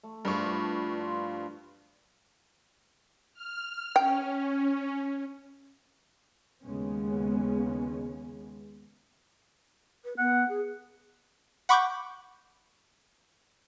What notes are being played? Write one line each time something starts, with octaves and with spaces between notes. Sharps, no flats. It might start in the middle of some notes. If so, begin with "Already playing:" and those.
A3
G2 F3 D4 E4 C#6
F4
F6
C#4 G5
D#2 C#3 G#3 B3 C#4
B4
B3 F#5
G#4
F#5 B5 C#6 D6 F#6 G6